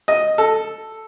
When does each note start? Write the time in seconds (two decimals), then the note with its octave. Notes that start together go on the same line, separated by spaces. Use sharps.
0.08 D#5
0.38 A4